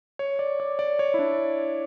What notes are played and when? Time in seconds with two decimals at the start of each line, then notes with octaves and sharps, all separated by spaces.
0.19 C#5
0.39 D5
0.60 D5
0.79 D5
0.99 C#5
1.14 E4
1.19 D4